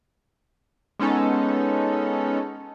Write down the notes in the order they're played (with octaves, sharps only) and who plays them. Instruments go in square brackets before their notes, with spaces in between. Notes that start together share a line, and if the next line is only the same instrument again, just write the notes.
[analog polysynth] G#3 B3 C#4 D#4 A4